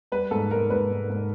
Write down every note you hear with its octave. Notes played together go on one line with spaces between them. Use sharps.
G3 B4
G#2 A4
G#2 A#4
G#2 B4
G#2
G#2